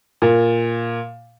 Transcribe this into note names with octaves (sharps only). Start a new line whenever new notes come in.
A#2